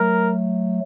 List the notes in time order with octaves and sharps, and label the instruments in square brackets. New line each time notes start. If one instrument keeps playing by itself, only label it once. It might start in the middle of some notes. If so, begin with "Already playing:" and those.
Already playing: [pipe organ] F#3 A3 [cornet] A#4